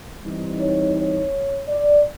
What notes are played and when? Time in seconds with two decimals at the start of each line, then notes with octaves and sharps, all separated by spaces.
0.22 E3 G3 C4 D#4
0.59 C#5
0.96 C#5
1.69 D5